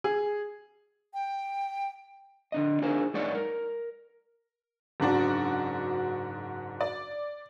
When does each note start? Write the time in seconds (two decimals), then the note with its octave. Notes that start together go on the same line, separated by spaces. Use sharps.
0.04 G#4
1.14 G5
2.52 D3 D4 D#5
2.82 D4 D#4 F4 G#4 A#4 C5
3.14 G#3 D#4 C#5 D5 F#5
3.34 A#4
5.00 F#1 G#2 D4 F#4
6.81 D5